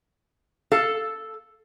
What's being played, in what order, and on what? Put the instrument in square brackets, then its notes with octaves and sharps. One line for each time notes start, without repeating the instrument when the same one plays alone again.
[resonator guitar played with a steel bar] A4 F5